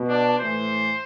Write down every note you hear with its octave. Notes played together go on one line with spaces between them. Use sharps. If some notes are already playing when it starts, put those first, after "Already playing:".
Already playing: B2
D4
A2 E3 C5